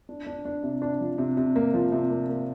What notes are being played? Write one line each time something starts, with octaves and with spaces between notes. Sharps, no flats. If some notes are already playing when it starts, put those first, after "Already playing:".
D4
D4
D4
C3
D4
F3
C3
C3
A#3
F3
C3
A#3
A#3